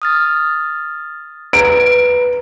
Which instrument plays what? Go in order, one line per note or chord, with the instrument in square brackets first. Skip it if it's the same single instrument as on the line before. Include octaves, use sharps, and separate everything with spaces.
[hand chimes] D#6 F6 A6
[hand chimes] B4 A#5 [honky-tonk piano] D7